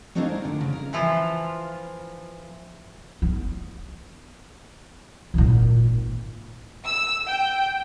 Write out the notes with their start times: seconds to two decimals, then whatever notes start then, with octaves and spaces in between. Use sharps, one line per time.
0.15 A3 C4 D4 D#4 F4 G#4
0.29 A#4
0.45 D3
0.61 C#3
0.73 A#4
0.93 E3 F3 E4 F4
3.22 B3
5.34 G#1 A#2
6.86 E6
7.28 G5